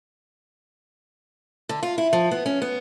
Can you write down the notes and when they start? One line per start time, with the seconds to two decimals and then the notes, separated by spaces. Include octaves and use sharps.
1.69 D3
1.83 F4
1.98 E4
2.13 F3
2.31 B3
2.46 C#4
2.62 B3